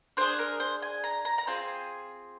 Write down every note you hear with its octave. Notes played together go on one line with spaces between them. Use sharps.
D4 G#4 C5
A#4
C5
G#5
A#5
A#5
A#5
C4 F4 G#4 G#5